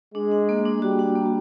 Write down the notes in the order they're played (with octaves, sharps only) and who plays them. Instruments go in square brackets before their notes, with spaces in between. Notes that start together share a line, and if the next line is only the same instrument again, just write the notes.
[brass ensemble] G#3 G#4 [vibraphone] D4
[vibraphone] D4
A#3
D4
[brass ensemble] G3 G4 [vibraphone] F#4
[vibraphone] D4
A#3